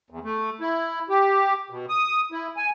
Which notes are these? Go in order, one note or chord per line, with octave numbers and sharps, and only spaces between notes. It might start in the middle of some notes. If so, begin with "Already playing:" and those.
E2
A3
E4
G4
B2
D#6
E4
G#5